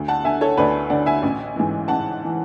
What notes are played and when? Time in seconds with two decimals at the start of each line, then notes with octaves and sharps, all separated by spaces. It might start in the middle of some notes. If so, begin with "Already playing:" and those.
Already playing: D2
0.08 F#5 A5
0.24 D3 E5 G#5
0.41 A4 C#5
0.57 D2 B4 D5
0.90 D3 D5 F#5
1.06 E5 G#5
1.22 A1
1.56 G#2 E3
1.88 A1 F#5 A5
2.25 E3